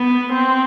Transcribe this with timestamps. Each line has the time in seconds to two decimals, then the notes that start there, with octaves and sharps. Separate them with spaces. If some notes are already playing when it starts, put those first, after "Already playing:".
Already playing: B3
0.33 C4